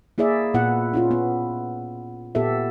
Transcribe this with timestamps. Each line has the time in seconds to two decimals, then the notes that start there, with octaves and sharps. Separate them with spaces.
0.18 A#3 E4 G#4 D5 E5
0.54 A#2 B3 E4 F#5
0.94 C#4 E4 F4
1.11 B3
2.35 A#2 B3 G4 A4 E5